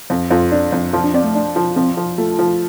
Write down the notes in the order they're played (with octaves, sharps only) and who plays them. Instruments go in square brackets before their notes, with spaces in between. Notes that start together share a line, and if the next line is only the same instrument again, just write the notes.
[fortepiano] F2
[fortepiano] F2 [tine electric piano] F4
[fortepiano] D4
F2
[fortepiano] F3 [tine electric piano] F4
[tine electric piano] D4
[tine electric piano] C4 [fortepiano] D5
[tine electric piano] A3
[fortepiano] D4
F3
[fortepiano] F3 [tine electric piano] C4
[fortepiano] F3
[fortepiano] A3 [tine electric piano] F4
[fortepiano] F3